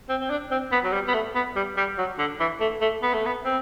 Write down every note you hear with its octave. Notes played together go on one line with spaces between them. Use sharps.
C4
C4
D4
C4
B3
F#3
G3
B3
A3
B3
G3
G3
F#3
D3
E3
A3
A3
B3
A3
B3
C4